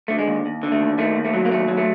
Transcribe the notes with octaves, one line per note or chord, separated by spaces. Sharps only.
D3 A3
G#3
D#2
D#2
D3
A3
D#2
D#3 A3
D#2
A3
F#3
A#3
D#2 A3
F#3
A3